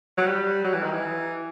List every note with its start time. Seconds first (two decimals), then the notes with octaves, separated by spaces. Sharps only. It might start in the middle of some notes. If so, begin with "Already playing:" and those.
0.18 F#3
0.26 G3
0.64 F#3
0.74 E3
0.83 D#3
0.92 E3